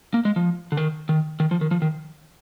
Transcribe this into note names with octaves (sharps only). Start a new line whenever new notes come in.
A#3
G#3
F3
D3
D#3
D#3
D#3
F3
D#3
F3
D#3